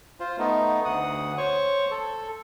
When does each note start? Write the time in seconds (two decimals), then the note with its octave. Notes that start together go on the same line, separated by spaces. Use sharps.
0.20 F4 C5
0.39 A3 B3 D#4
0.85 D2 F#5 D#6
1.38 C5 C#5 C#6
1.91 A4